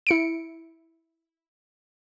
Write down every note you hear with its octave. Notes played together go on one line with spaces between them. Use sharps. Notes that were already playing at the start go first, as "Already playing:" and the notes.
E4 C#7 D7